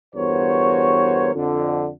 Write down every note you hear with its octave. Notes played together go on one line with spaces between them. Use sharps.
E2 G2 F#4 A#4 C5 C#5
F2 D3